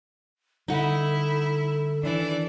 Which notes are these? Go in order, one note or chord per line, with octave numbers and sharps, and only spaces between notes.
D3 G3 D#4 E4 A4 F#5
D#3 E3 D4 D5